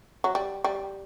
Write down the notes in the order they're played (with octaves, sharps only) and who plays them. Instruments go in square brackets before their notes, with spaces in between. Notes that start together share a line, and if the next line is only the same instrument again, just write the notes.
[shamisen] F#3
G3
G3